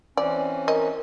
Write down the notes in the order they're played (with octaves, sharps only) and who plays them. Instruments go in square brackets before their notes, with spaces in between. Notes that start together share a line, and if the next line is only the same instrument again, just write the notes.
[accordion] E3 C4 C#4 [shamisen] D5
[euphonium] A#4 [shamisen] D#5